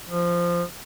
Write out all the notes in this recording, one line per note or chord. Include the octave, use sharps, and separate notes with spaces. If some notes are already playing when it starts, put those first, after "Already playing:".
F3